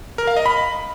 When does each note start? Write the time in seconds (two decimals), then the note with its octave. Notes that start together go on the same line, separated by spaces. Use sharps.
0.18 A#4
0.27 F5
0.37 D#5
0.46 B5